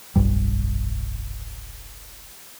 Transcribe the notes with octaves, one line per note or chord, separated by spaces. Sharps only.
F1 B1 G2 G3